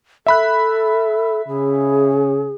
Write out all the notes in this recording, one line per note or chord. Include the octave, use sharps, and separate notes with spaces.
A4 E5 B5 F#6
C#3 G#4